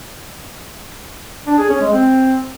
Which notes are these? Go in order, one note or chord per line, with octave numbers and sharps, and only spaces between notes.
D4
G#4
C#4
G#3
C4